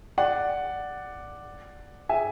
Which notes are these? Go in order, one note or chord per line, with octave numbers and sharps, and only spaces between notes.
D5 F#5
E5 G#5